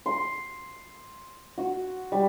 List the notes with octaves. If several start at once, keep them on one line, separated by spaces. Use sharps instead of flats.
C6
F#4
G3